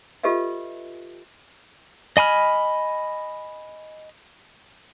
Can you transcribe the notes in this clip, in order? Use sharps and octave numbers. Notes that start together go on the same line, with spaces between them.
F4 G4 A4 B4 D#5 E5
D#5 G#5 B5 F6